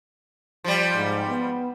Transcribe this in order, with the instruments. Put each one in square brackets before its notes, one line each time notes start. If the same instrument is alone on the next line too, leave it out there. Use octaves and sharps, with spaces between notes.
[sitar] F3 G3
[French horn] G#2
B3